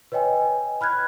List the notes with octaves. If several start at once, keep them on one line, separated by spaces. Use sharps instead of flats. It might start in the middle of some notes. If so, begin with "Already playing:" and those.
B4 C#5 D#5 G5 G#5
B5 F6 F#6 G#6